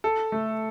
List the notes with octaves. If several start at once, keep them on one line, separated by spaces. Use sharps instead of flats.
A4
A3